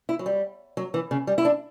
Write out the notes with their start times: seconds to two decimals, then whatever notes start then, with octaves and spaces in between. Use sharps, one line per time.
0.09 E4
0.19 F#3
0.26 G3
0.77 F#3
0.94 E3
1.11 C#3
1.27 G3
1.38 E4
1.45 D4